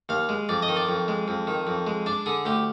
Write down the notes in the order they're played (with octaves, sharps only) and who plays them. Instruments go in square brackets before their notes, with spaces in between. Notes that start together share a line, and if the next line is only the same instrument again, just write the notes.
[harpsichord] D#2 F5
G#3
F2 D5
D#5
D#3
D5
F2
G#3
F2
D#3
F2
G#3
D4 D5
D3 G#4
D2 G4